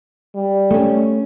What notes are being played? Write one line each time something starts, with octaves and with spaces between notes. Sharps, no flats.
G3
A3 C#4